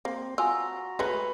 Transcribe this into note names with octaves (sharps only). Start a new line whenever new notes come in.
A#3 C4 C5
F4 F#4 G#5 A#5 E6
G#3 A3 C#4 B4